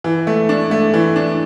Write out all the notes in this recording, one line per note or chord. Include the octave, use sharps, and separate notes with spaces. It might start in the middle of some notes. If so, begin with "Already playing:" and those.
E3
A3
D4
A3
E3
D4